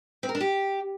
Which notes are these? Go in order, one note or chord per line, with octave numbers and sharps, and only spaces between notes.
C4
A#4
D4
G4